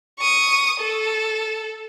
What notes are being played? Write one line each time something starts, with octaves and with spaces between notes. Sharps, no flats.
C#6 D#6
A4